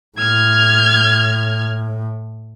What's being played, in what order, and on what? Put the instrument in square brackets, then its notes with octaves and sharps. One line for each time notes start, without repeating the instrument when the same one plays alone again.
[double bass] A2 [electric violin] F6 G#6